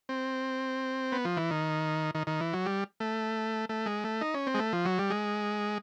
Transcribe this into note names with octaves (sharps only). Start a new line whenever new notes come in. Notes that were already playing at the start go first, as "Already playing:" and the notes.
C4
B3
F3
E3
D#3
D#3
D#3
E3
F#3
G3
A3
A3
G#3
A3
D#4
C#4
C4
G#3
A3
F3
F#3
G3
G#3